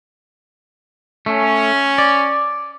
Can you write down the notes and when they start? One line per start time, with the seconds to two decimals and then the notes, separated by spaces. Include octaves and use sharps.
1.26 A3 C#4
1.98 D5